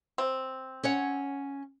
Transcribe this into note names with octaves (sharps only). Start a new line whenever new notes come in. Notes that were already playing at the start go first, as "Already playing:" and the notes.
C4
C#4 C#5 F#5